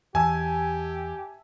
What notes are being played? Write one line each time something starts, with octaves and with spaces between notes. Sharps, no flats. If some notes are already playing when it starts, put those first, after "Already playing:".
E2 G4 E5 G#5 A5